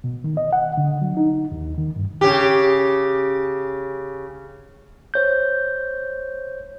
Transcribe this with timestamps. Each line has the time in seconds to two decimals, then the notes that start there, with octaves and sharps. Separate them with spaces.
0.04 B2
0.24 D#3
0.37 D#5
0.53 F#5
0.77 D3
1.02 F#3
1.17 D#4
1.52 D#2
1.78 D#3
1.96 G2
2.21 C#3 G4
5.14 C5 C#5 G6